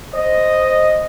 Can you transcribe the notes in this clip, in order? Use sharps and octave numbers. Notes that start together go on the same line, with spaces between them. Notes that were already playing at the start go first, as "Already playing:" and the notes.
C5 D#5